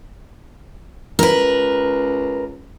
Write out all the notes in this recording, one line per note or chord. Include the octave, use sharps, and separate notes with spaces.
C#2 A#4 B4